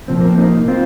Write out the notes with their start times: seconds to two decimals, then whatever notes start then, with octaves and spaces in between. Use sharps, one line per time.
0.08 C2 A#2 F3 C4
0.21 A#3
0.29 C4
0.38 A#3 D#4
0.68 C4 F4